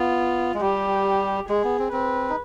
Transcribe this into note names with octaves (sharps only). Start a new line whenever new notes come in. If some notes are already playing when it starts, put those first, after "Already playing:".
Already playing: B3 F4
G#3
G3 G4
G#3 G#4
B3
C4
C4 B4
D#4